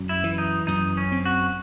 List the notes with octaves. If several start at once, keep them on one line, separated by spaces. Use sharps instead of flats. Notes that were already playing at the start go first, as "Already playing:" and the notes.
Already playing: F#2
E4
E3
D#4
F#2 D#4
C#4
C4
F#4